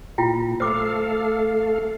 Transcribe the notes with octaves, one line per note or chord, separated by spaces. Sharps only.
A#2 E4 F4 G5
A3 A4 C5 F5 D6